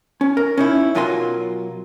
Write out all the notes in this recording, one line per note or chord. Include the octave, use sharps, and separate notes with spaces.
C#4
A#4
C#4 D#4 E4
B1 F#3 F4 A#4 G#5 C6